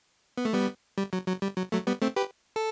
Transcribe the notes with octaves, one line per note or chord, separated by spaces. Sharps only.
B3
A3
G3 B3
G3
F#3
F#3
G3
F#3
F#3 A3
G3 B3
A3 C4
G4 B4
A4